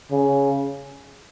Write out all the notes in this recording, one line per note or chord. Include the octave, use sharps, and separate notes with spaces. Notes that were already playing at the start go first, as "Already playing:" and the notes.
C#3